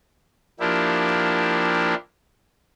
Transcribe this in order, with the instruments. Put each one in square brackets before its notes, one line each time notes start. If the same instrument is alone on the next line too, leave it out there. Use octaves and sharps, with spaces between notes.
[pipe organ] F3 A#3 D4 E4 G4